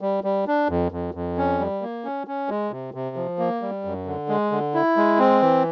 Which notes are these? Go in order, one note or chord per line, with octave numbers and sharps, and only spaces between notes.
G3
G3
D4
F2
F2
F2
C#4
G3
A#3
C#4
C#4
G#3
C3
C3
F3
A#3
G3
F#2
D3
G#3
D3
E4
G#3
C4
E3